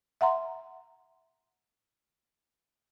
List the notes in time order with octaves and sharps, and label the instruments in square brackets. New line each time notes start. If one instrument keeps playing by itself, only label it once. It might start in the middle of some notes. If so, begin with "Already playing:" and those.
[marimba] E5 F#5 A#5 C6